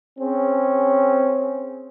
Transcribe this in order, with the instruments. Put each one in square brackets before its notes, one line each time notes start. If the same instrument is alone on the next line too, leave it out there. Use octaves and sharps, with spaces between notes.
[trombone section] C4 C#4 G#4